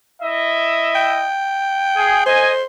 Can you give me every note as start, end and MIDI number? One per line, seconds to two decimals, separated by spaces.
0.22 1.27 64
0.22 1.27 75
0.22 1.27 76
0.95 2.26 79
1.96 2.21 68
2.26 2.64 72
2.26 2.51 75
2.26 2.51 80